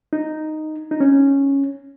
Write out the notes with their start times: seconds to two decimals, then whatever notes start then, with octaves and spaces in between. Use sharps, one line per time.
0.13 D#4
0.91 D#4
1.00 C#4